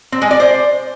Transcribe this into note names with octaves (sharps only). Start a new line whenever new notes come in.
C4
G#3
D5
C5